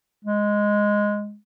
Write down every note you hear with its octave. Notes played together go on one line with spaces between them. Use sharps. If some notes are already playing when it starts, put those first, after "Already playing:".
G#3